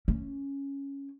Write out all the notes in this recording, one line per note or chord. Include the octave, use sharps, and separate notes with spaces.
C#4